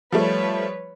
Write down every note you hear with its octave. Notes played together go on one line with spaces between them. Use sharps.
F3 G3 A3 B4 C#5